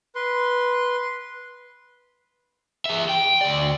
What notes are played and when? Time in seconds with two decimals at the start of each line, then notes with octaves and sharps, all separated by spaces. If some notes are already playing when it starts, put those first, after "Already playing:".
0.15 B4 C6
2.86 G#4 E5
3.09 G5
3.41 D2 D5